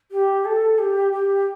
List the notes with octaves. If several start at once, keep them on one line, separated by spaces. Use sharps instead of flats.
G4
A4
G4
G4